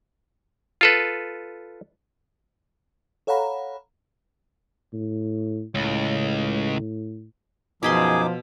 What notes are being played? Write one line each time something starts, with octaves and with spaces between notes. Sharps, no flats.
F4 A4 B4
A4 C#5 F5 F#5 A#5 B5
A2
C#2 A2
F#2 B2 F3 D#4 G#4 B5 C6 D6